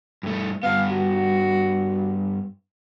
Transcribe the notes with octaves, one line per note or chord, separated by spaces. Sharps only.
G2 A3
G2 B3 F5
F#4